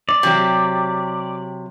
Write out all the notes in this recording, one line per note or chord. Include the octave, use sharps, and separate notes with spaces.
D5
C3 F#3 G4